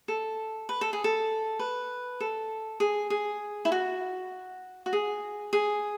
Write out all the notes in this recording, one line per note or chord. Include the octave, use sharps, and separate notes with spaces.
A4
B4
A4
G#4
A4
B4
A4
G#4
G#4
E4
F#4
F#4
G#4
G#4